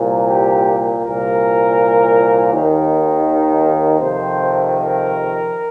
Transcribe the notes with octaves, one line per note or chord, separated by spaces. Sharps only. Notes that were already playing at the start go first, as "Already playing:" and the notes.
Already playing: C2 A#2
G4
C2 A#2 A#4
D#2 D#3
A#4
F2 C3 D#3 C5
A#4